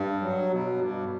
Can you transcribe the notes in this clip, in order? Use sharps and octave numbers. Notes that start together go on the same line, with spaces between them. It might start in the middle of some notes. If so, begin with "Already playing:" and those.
Already playing: G2
F#3
B2
G2